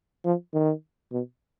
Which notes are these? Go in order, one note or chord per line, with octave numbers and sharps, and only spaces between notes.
F3
D#3
B2